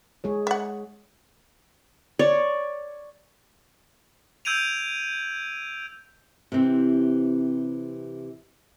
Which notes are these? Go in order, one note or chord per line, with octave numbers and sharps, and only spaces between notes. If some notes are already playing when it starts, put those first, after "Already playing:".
G#3 G#4 C#5
E5 F#5
C#5 D5
E6 G6 G#6 D7 D#7 F7
C3 E3 C4